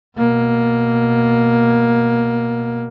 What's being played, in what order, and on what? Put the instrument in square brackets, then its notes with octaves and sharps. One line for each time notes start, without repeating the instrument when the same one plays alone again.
[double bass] B2 A#3